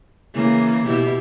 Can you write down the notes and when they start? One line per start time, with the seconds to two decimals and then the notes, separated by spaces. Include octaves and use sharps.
0.34 C#3 E3 A#3
0.86 B2 E4 G4